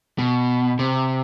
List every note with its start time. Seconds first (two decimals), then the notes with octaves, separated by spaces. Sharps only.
0.18 B2
0.79 C3